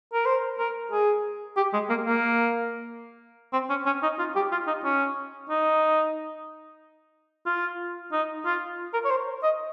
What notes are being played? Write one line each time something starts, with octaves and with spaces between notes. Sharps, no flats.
A#4
C5
A#4
G#4
G4
G#3
A#3
A#3
C4
C#4
C#4
D#4
F4
G4
F4
D#4
C#4
D#4
F4
D#4
F4
A#4
C#5
C5
D#5